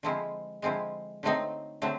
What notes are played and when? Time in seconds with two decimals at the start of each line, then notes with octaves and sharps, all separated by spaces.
0.03 D3 F3 G#3 C4 E4
0.62 D3 F3 G#3 C4 E4
1.23 D3 F#3 A3 C4 D#4
1.82 D3 F#3 A3 C4